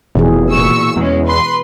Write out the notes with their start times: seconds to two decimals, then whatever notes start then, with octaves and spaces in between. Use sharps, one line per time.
0.15 F1 B2 E3 G#4
0.50 A#2 C#6 E6
0.96 E2 G#3 C#4
1.26 B4 C6